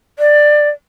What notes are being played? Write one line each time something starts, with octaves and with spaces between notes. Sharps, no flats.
D5